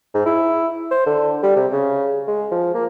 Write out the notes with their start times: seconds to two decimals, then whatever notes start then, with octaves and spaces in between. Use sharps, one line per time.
0.14 G#2
0.26 E4
0.91 C5
1.06 D3
1.43 G3
1.56 C3
1.72 C#3
2.27 G#3
2.52 F3
2.74 A#3